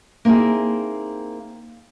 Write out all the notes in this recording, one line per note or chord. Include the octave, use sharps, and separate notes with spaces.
A#3 C4 D#4 E4 G#4